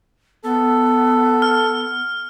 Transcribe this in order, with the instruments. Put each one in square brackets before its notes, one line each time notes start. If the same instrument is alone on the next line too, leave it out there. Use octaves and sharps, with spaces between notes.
[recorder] B3 [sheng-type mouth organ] A4
[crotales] F6